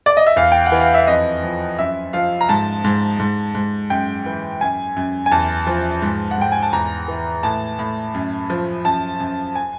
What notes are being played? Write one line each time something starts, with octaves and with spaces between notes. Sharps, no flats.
D5
D#5
E5
E2 F5
G5
F#5
E3
F5
E5
F2 D#5
F3
F#2 E5
F3 F5
A#5
G#2 A5
G#2
G#2
G#2
F#2 G5
E3
F#2 G#5
F#2
G#5
E2 A5
F3
G#2
F#5
G#2 G5
G#5
A5
E2 A#5
E3
A2 A5
A2
F#2
F3
F#2 A5
F#2
G#5